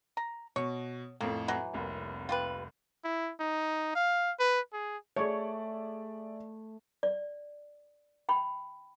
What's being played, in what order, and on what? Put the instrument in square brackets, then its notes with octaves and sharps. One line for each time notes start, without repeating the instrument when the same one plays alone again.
[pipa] A#5
[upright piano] B2 [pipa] C#5
[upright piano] F2 A2 [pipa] A#3
[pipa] E3 F#3
[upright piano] F1 C2 A#3
[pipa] F4 G4 B4
[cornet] E4
D#4
F5
B4
G#4
[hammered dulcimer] A3 [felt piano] G#4 D5 E5 [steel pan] C#5
[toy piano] D5
G5 B5